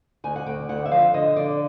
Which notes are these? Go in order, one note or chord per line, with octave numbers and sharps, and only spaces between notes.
D2 G#5
F#5
D2 G5
D2 F#5
E5
F3 F5
D3 D#5
D3 D5